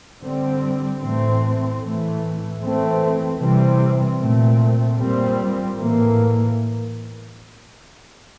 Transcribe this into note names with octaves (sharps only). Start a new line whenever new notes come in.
D3 G3 C4
A2 E3 A3 C4
A2 E3 A3
E3 A3 C4
C3 E3 G3 C4
A#2 A3 C4
A#2 G3 C4
A2 E3 A#3